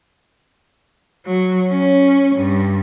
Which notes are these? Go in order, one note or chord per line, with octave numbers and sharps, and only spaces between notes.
F#3
C#4
G2